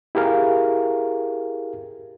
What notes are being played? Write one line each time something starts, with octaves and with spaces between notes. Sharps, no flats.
E4 G4 G#4 A#4 F5